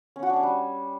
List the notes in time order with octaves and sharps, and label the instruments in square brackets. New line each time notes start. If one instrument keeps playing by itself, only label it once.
[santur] C#4
F#4
D4
C#4
G3